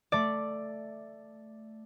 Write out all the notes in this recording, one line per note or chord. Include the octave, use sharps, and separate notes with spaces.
A3 D5